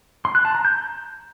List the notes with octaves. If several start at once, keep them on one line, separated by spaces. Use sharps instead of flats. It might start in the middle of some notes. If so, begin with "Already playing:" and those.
C6
F#6
A5
A#5
G6